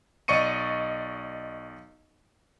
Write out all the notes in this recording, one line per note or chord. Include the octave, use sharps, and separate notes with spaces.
B1 D5 D#5 C#6 C#7 D#7